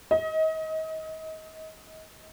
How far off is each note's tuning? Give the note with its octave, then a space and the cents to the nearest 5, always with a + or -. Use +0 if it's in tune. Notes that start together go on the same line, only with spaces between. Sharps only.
D#5 +30